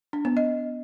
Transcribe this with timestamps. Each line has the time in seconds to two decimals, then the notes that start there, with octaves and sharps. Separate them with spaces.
0.13 D4
0.25 B3
0.37 D#5